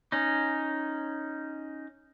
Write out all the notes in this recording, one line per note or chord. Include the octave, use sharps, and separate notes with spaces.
C#4 D#4